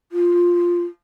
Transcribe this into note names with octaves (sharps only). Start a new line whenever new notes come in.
F4